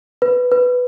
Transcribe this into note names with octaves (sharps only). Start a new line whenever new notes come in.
B4
B4